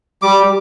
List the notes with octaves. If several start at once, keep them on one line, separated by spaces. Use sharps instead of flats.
G3 D6